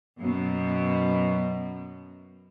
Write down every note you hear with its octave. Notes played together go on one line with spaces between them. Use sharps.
F#2 B2